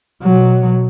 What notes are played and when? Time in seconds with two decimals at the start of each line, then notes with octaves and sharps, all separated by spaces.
0.23 B2 F#3